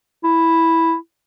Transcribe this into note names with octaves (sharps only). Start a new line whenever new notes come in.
E4